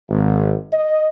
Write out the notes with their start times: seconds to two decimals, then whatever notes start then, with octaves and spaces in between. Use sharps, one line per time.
0.10 G#1
0.73 D#5